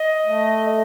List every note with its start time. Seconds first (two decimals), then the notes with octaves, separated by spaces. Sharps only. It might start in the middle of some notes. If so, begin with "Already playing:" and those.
Already playing: D#5
0.26 A3